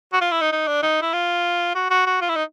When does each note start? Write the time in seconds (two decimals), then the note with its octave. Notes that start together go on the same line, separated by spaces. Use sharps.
0.13 F#4
0.21 F4
0.32 E4
0.41 D#4
0.52 D#4
0.67 D4
0.83 D#4
1.02 E4
1.13 F4
1.75 F#4
1.90 F#4
2.06 F#4
2.21 F4
2.29 E4
2.36 D#4